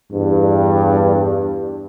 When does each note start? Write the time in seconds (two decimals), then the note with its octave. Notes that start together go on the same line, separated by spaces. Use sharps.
0.12 E2 G2